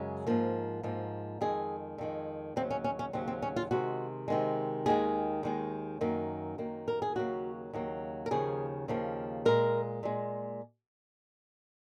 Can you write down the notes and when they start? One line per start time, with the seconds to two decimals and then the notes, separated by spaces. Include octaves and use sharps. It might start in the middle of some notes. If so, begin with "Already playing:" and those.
Already playing: F#2 C#3 G#3
0.27 G#2 F3 A#3
0.83 G#2 F3 A#3
1.41 F2 D#3 G#3 G#4
1.98 F2 D#3 G#3
2.56 D#2 C#3 F#3 C4
2.71 C#4
2.84 C#4
2.99 C#4
3.13 D#2 C#3 F#3 C4
3.28 C4
3.42 C#4
3.56 F4
3.71 C3 D#3 G#3 F#4
4.28 C3 D#3 G#3
4.86 D#2 D#3 G#3 G#4
5.43 D#2 D#3 G#3
6.01 F#2 D#3 A#3
6.58 F#2 D#3 A#3
6.88 A#4
7.02 G#4
7.15 D#2 C#3 F#3 A#3 F#4
7.73 D#2 C#3 F#3 A#3
8.26 A#4
8.31 D#2 C#3 F3 A#3 G#4
8.88 D#2 C#3 F3 A#3
9.45 A#2 G#3 A#4
10.03 A#2 G#3